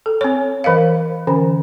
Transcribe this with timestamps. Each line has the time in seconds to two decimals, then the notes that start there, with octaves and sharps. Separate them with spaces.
0.06 A4
0.21 C4 C#5
0.64 E3 A#4 D#5 F5
1.27 D3 E3 C#4